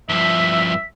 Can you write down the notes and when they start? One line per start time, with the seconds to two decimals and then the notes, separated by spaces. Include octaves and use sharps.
0.09 G2 F3 E5 B6